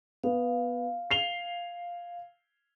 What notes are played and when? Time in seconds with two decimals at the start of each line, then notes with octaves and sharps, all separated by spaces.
0.23 B3 F5
1.11 C7 F7 G7